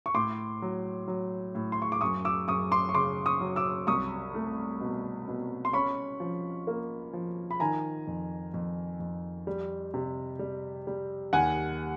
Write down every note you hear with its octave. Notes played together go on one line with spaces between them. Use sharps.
C#6
A2 C6 D6
F#3
F#3
A2
C6
C#6
D6
F#2 C#6 D#6
D6 E6
F#2 C#6 D#6
C6 D6
C#6
C#3 C6 D6
C#6 D#6
F#3
D6 E6
C2 C#6 D#6
A3
B2
B2
C6
C#4 B5 C#6
F3
A#3
F3
B5
D#3 G#5 A#5
F2
F2
F2
G3
C3
G3
G3
D#2 F#5 G#5